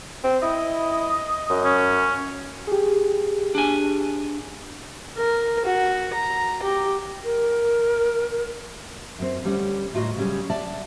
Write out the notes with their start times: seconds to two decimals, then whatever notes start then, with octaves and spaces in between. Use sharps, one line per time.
0.24 C4
0.43 E4 D#5
1.50 F#2
1.65 C#4
2.67 G4 G#4
3.55 D4 G#5
5.17 A#4
5.65 F#4
6.14 A#5
6.62 G4
7.24 A#4
9.19 F#2 C4
9.44 D2 G3 C#4 F#5
9.93 D2 A2 F4 F#4 D#5 A#5
10.17 C#3 F#3 G3 C#4 G#4
10.50 D5 E5 F#5 A5